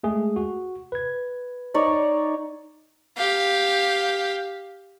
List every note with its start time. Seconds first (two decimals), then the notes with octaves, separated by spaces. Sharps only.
0.03 G#3 A3 G#4
0.36 F#4
0.92 B4 G#6
1.74 D#4 C#5 D5
3.17 G4 F5